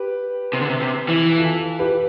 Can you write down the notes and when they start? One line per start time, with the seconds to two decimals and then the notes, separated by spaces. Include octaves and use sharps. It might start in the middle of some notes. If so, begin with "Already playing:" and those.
Already playing: G4 B4
0.53 C3
0.61 D3
0.69 C3
0.82 C3
1.09 E3
1.37 F4 A4
1.79 G4 B4